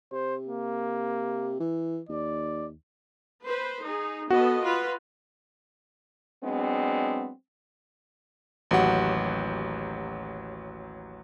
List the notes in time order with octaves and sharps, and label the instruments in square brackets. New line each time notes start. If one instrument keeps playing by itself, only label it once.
[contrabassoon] C3 [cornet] C5
[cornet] A#3
[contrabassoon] E3
[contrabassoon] D#2 [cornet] D5
[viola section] B4 C5
D#4 G#4
[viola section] B3 A4 D#5 [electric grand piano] F#4
[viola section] F4 B4
[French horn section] F#3 G#3 B3 C4 D4
[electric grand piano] A1 D#2 F#3 F#4 G4 F#5